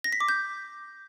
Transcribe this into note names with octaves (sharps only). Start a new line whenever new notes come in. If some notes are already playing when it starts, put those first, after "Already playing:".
A#6
B6
D6
G6